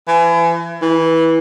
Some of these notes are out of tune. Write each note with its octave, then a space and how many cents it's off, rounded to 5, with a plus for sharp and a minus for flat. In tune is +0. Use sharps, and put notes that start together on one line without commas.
E3 +35
E3 -15